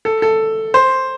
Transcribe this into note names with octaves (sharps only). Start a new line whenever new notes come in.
A4
A4
C5